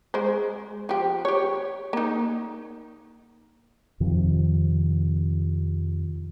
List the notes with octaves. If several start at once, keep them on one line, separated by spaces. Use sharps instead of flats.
G#3 C5
F3 G4
G4 C#5
A#3 D#4
F2 C3 D#3 F3